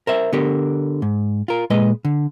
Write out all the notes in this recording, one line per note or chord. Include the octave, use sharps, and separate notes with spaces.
A#4 C5 E5
D3 B3 G4 A#4
G#2
F4 A#4
A#2 G#3 B4 D#5
D3